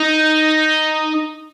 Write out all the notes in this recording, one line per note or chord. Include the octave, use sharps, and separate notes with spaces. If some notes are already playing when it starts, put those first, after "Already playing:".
Already playing: D#4